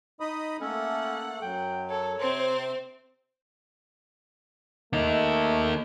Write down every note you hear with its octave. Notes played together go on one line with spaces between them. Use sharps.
D#4 D#5 B5 D#6
A3 A#3 C#4 A4 F#5
F#2 F#3 G5
A4 C#5
C3 C4 C5 C6
A3 A#3 D#4